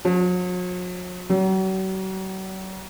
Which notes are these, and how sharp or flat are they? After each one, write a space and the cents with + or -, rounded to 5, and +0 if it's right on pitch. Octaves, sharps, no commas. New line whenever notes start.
F#3 -45
F#3 +40